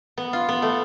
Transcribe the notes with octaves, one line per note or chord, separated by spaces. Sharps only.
B3
F4
B3
A3